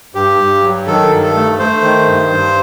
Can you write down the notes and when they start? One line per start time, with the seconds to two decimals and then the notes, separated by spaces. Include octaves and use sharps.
0.15 G2 G4
0.39 G2
0.63 F#3
0.86 D#3 A4
1.11 G2
1.23 A4
1.34 A3
1.59 A3 C5
1.82 D#3
2.06 G2
2.31 G2